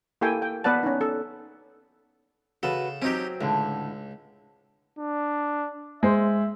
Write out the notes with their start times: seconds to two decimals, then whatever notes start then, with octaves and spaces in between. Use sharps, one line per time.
0.21 A#3 E4 G4 A4 G5 G#5
0.42 G5
0.64 B3 B4 D5 F#5 A5
0.83 C#4 D#4
1.01 A4
2.63 C#3 F#4 A4 B4
3.02 F#3 C4 C#4 D#4 G4
3.41 C#2 A2 D3
4.99 D4
6.03 G#3 C5 E5